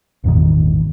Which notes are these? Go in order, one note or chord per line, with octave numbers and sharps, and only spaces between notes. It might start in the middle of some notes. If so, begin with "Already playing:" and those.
G#1 E2 A#2 D#3